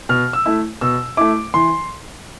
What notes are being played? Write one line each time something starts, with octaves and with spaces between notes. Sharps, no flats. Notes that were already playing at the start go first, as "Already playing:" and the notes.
B2 F6
E6
A3 E4
B2 E6
A3 E4 D6
E3 C6